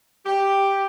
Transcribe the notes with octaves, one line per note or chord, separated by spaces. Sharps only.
G4